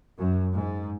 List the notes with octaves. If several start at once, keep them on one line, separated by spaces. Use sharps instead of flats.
F#2
G#2